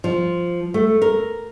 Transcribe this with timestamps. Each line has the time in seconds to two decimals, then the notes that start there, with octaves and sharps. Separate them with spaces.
0.04 F3
0.74 A3
1.02 A#4